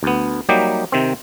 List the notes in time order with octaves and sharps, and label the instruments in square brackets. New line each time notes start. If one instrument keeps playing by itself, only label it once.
[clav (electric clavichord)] D2 B3
F#3 G3 A#3 D#4 G4
C3 D#3 C4